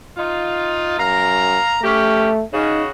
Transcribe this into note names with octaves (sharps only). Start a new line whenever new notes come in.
D#4 F4
F#2 F5 A#5
A3 C#4 G4
C#3 C#4 D#4 F#4